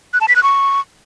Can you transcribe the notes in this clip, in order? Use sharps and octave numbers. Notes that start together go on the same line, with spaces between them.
F#6
A5
B6
F#6
C#6